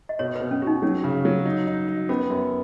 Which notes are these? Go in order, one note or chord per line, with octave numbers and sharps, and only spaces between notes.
D#5
B2 C#5
B2 B4
C#4
F#4
D#4
F#3 C#4
C#3
F#3
D#4
D#4
D#4
B3 C#4
F#2